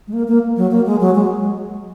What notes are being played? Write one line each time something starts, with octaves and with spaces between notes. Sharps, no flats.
G#3
A#3
A#3
F#3
A#3
G#3
F#3
G#3